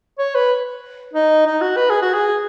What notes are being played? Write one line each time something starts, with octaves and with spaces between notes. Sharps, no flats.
C#5
B4
D#4
D#4
F#4
B4
G#4
F#4
G#4